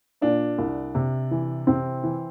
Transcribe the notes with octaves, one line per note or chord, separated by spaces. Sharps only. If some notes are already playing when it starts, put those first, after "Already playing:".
A#2 D4
C2
C3
E3
C3 C4
E3